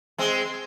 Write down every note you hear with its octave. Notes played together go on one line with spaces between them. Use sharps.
G#3 C4